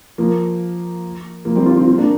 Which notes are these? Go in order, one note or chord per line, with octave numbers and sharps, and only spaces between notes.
F3 A#3
F3 A#3
G3 C4
C4 F4
C4 F4
C4 F4
A#3 D4